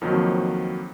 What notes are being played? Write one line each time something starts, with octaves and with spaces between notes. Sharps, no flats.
F2 D#3 F3 F#3 A#3